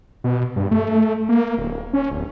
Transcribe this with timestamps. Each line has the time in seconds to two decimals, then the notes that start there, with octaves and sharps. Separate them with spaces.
0.24 B2
0.56 G2
0.71 A3
1.29 A#3
1.58 D1
1.93 C#4
2.11 D1